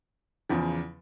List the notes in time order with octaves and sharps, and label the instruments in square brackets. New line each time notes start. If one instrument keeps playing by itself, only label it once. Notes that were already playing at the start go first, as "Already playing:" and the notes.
[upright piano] E2 C#3 F3